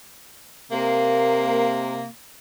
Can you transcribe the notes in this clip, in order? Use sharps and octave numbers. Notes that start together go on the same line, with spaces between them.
C3 A#3